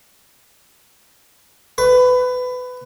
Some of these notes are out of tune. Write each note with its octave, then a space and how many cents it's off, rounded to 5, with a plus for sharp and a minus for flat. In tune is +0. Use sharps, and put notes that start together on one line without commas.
B4 +20